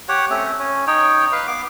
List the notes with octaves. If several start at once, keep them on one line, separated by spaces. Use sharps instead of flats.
G4 C#5 F#5
A3 C4 C#4
C#4
D#4 C#5 G5
B4 F5
B3 D6